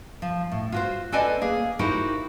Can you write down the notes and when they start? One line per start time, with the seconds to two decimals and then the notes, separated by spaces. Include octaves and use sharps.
0.22 F3
0.52 A2
0.72 F4 F#4 C5
1.12 C4 A4 B4 D5 D#5 G#5
1.41 A#3 G#4
1.79 D#4 E4 F#4 G4 A#4 C5